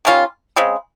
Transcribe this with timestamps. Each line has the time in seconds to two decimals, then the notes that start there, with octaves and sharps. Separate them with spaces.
0.05 D#3 G3 C#4 F4
0.56 C#3 G#3 C4